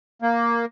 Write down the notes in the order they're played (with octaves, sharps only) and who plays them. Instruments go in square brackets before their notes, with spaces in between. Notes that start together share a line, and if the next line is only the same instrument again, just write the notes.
[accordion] A#3